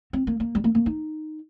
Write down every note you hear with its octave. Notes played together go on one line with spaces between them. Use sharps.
C4
A#3
A#3
G3
A#3
A#3
D#4